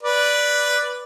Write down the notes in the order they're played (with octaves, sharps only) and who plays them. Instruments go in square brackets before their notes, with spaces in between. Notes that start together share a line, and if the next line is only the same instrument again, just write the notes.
[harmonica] B4 D5